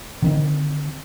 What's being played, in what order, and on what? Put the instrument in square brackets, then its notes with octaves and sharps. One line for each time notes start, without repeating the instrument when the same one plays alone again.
[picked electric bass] D3 D#3 C4